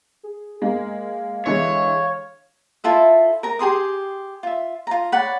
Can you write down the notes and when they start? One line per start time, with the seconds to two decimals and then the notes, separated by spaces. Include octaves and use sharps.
0.23 G#4
0.62 G#3 A#3 F5
1.46 D3 E3 G#3 C#5
2.84 E4 F4 A4 E5
3.43 A#4 A#5
3.59 G4 G#4 C6 D#6
4.43 F4 E5
4.87 F4 A#5
5.12 C#5 D5 F#5 B5